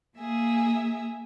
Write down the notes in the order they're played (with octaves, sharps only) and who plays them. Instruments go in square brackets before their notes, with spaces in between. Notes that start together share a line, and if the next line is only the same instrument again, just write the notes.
[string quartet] A#3 G#4 E5